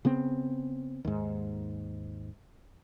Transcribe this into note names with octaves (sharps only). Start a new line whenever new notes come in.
C#3 B3 C4
D#2 G#2